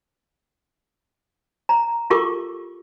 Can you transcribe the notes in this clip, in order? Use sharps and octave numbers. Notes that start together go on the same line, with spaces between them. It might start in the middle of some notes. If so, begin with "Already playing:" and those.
A#5
F4 G4 A4 A#4 C#6 D6